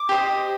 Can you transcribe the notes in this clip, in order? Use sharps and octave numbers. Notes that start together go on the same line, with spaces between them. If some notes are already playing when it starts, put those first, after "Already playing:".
Already playing: D6
G4 C5 D#5